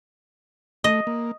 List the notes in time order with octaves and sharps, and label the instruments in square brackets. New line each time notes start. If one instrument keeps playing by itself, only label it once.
[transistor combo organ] A3 [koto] D#5
[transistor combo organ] A#3